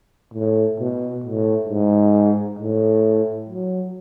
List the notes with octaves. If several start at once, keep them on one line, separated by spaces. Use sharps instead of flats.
A2
B2
A2
G#2
A2
F#3